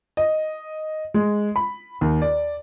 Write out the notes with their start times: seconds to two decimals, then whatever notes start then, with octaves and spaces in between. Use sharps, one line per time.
0.17 D#5
1.14 G#3
1.56 B5
2.01 D#2
2.22 D5